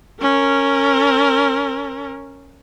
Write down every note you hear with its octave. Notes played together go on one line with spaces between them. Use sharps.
C#4 A#4